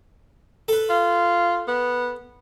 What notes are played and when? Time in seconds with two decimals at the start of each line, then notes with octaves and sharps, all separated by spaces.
0.68 A4 B4
0.89 F4
1.67 B3